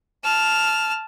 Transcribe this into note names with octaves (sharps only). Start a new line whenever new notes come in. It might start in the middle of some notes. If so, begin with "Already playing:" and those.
A5 F6